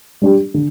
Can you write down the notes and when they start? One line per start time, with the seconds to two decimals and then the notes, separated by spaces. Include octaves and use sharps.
0.22 G3 D4 G4
0.54 D3